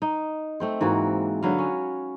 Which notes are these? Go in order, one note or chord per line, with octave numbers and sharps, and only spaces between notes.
D#4
A3 C4 C5
G#2 E3 A#3 F#4
D3 F#3 B4 F5
C#4